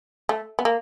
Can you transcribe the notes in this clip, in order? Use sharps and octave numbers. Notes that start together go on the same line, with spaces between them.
A3
B3
A#3